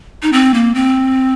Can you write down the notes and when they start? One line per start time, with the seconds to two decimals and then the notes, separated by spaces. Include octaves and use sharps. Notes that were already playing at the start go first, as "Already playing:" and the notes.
0.23 D#4
0.33 C4
0.54 A#3
0.75 C4